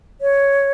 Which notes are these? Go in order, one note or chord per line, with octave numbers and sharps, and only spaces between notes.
C#5